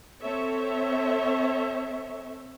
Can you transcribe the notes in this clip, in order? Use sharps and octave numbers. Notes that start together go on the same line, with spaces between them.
C4 A4 C#5 E5